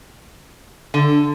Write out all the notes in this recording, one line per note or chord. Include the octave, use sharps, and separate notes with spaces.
D3